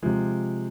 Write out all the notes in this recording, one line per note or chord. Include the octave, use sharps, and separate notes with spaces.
C3 F3 G#3